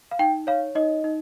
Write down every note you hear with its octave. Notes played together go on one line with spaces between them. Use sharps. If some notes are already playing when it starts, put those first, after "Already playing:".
F5
D#4 G5
C#5 F5
D#4 D#5
D#4